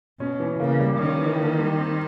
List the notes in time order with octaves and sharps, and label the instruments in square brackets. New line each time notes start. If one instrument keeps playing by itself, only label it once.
[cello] B2 [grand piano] C#4
[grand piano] E3
[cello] C#3 [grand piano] A#3
[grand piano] G3
[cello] D#3 [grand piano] C#4
[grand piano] E3
A#3
G3
C4